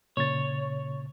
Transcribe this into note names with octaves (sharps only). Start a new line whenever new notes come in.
A#2 C#3 C#5 A6